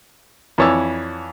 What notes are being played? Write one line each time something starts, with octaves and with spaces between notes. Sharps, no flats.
F2 E3 C#5 D5 E6